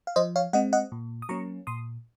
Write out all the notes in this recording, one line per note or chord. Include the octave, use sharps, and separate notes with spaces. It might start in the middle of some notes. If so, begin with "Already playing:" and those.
F5
F3 C5 D#5
C#5 F5
G#3 C4 D#5 F#5
D#5 F#5
A#2
D#6
F#3 A#3 C#4 A#5 C#6
A#2 C6 D#6